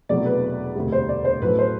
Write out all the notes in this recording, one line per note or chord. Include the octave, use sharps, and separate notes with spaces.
E1 E2 C3 F#3 A3 D5
B4
E1 D2 C3 G3
C5
D5
C5
A1 A2 F#3 A3 B4
C5